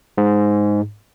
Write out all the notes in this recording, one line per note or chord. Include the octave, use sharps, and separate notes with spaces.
G#2